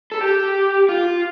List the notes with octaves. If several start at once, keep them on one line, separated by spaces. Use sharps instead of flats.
A4
G4
F4